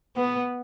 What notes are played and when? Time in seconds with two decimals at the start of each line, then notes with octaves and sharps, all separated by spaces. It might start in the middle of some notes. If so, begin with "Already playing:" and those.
0.17 B3